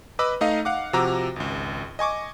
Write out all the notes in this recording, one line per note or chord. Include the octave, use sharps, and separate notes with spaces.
B4 D#5 B5 D6 E6
A3 D#4 D#5 F5
F5 F#5 D6
C3 F3 F#4 A#5 D6 E6
G#1 C#2
D#5 G#5 C#6 D6